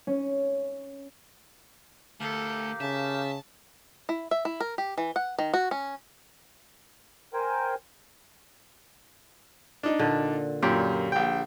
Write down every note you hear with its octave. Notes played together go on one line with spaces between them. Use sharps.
C#4
D2 G4 A4 A#4 F5
C#3 E5 A5
E4
E5
E4
A#4
G4
E3
F#5
D#3
F#4
C#4
A#4 C5 G5 G#5
D4 D#4
A#2 D3
F#2 A#2 G4
A#1 G5